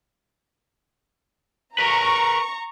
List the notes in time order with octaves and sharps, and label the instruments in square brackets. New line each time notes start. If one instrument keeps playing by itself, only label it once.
[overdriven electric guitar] A#4 B4 [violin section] A#5 C#6